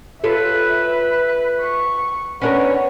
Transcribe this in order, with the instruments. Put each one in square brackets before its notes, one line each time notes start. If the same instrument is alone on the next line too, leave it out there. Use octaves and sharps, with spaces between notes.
[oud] F4 A4 C#5 [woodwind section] B4 [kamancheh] E5
[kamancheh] C#6
[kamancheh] B3 C#5 [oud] C#4 D4 A#4